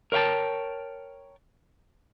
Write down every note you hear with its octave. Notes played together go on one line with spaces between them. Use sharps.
A#4 C#5 F5 G5 A5